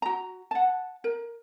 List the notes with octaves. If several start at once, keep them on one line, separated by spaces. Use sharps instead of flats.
F#4 A#5
F#5 A5
A#4